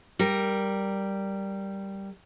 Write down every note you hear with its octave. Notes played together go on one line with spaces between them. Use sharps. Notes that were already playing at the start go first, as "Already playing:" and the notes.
G3 A#4